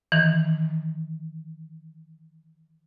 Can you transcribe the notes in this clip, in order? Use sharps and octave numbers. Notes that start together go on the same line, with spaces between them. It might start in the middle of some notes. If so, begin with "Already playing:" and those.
D#3 E3